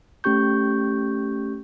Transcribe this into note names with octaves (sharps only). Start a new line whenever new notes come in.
A3 C#4 G4 C#6 G6